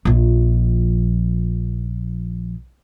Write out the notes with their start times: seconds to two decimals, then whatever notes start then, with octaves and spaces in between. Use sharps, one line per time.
0.05 A#1 F3